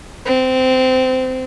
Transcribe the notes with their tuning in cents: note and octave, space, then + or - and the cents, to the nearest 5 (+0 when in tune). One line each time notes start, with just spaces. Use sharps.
C4 -20